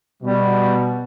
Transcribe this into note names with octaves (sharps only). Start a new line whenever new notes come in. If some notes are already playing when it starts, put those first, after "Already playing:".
B2 G3